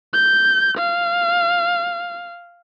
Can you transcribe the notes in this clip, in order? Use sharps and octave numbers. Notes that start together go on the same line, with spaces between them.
G6
F5